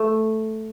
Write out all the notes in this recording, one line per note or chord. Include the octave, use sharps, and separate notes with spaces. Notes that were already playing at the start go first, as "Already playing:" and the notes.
Already playing: A3